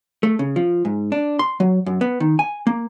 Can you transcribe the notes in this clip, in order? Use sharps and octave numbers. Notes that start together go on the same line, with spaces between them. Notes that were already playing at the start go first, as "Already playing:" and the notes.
A3
C#3
F3
G#2
D4
C6
F#3
F#2
B3
D#3
G#5
A#3